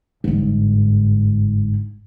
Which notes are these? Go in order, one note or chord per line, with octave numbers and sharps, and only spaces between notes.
G1 G#2